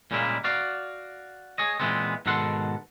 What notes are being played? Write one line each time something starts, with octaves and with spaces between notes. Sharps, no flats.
A#2 C#3 G3 G#3 A#3 E4
F#4 D5 F5
G#4 C#5 D#5
A#2 C#3 E3 G#3 B3 C4
G#2 B2 D#3 A4 F#5 C6